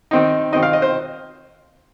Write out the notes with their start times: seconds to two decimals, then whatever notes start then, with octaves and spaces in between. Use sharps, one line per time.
0.11 D#3 C4 D#4
0.52 D#3 C4 D#4 D#5
0.63 F5
0.73 D#5
0.82 C5